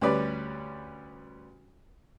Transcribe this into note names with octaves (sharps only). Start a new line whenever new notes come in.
D2 G3 C#4 B4 D5